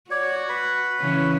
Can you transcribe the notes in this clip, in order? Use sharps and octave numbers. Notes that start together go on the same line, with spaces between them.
F#4 C#5 D5
B4 B5
C#3 E3 C#4